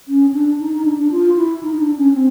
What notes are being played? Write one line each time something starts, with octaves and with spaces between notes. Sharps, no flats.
C#4
D4
D#4
D#4
D4
D4
F4
E4
D#4
D#4
D4
C#4
C4